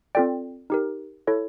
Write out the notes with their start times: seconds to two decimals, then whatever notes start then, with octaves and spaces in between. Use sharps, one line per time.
0.15 C4 F4 A4 D5 G5
0.70 D#4 G4 A#4
1.27 E4 A4 C#5